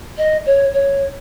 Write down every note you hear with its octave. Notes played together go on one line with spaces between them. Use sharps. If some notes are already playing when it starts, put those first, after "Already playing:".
D#5
C#5
C#5